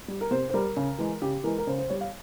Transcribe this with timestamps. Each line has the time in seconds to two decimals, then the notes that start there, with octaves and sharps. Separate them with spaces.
0.08 G3
0.21 A#4
0.31 C3 C5
0.49 C5
0.54 G3 A#4
0.77 C#3
0.98 E3 G#3
1.22 C#3 G4
1.44 E3 G#3 A#4
1.58 A#4
1.67 C#3 C5
1.78 C5
1.90 G3 C#5
2.01 F5